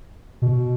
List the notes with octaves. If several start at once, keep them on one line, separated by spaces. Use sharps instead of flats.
B2